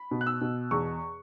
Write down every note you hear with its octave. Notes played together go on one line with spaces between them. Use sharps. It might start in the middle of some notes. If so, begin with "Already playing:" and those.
Already playing: B5
B2
F#6
E6
B2
E2 C#6